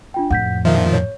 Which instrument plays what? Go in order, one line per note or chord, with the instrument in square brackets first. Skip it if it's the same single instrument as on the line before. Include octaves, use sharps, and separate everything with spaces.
[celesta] D4 F4 G5
[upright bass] F2 A2 [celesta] F#5 G6 B6
[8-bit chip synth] A#2 D#3 F3 [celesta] E5
[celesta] C#5